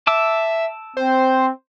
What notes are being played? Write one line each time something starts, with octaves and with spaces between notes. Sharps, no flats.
E5 A5 D6 E6
C4 C5